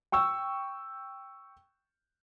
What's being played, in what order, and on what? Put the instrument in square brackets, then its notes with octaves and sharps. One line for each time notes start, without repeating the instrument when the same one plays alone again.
[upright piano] G5 C#6 E6